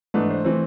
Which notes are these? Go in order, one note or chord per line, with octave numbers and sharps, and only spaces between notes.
G#2 E3 A3 D4 B4
C5
E3 A3 C4